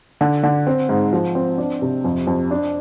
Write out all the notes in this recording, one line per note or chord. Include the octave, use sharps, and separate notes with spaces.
D3
D3
C4
G#2
F3
C4
D4
C3
F2
F2
D4